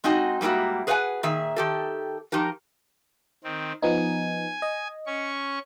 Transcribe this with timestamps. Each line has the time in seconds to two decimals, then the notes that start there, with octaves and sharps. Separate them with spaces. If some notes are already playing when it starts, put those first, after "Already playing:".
0.04 G#3 C4 D#4 F#4 D#5 G#5
0.41 G#2 G3 A#3 E4 F#4
0.87 G#4 B4 C5 F5 F#5 G#5
1.23 A#2 D#3 G#4 E5
1.56 D#3 G4 A4
2.32 F3 D#4 G4 A#4
3.44 D#3 C4
3.82 F3 B3 D#4 G#5
4.62 D#5
5.07 C#4 C#6